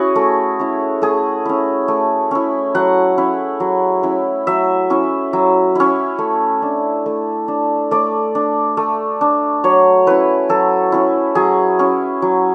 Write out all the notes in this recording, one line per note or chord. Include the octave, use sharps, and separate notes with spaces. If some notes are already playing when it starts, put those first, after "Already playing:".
Already playing: C#4 E4 F#4 G#4
A3
C#4 E4
A3 G#4
C#4 E4
A3
C#4 E4
F#3 F#5
C#4 E4
F#3
C#4 E4
F#3 E5
C#4 E4
F#3
C#4 E4
A3
D4
A3
D4
A3 D5
D4
A3
D4
F#3 C#5
C#4 E4 B4
F#3 A4
C#4 E4
F#3 G#4
C#4 E4
F#3